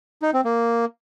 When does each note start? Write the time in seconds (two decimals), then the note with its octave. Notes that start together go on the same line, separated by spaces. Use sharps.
0.22 D#4
0.34 C4
0.45 A#3